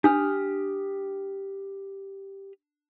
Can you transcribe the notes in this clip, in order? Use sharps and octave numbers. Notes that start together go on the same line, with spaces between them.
D4 G4 D#6 F6